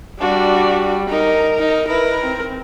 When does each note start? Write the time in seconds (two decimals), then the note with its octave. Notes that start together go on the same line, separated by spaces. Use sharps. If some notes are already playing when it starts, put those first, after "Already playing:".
0.20 G3 D4 F#4
1.09 D#4 A#4 A#5
1.58 D#4
1.88 E4 A#4 B4
2.21 C4